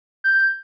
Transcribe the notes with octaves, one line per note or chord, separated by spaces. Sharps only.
G6